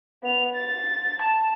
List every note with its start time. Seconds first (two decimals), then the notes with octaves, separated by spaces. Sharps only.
0.23 B3 F7
0.55 A6
1.21 A5